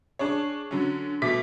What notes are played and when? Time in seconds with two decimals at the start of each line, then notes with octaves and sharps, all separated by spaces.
0.19 D4 G#4 C#5
0.71 D3 F#3 C#4
1.22 B2 A3 D6 B6